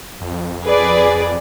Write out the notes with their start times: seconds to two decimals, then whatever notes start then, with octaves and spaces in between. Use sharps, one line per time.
0.21 F2
0.65 G#4 B4 D5